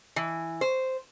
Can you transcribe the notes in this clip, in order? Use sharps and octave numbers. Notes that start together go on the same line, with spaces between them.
E3
C5